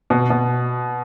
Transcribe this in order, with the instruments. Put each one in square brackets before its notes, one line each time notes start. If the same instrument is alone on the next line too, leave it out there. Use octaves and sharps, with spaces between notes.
[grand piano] B2
B2